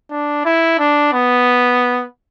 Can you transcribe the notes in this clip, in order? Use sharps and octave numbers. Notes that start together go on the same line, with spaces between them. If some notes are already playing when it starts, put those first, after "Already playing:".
D4
E4
D4
B3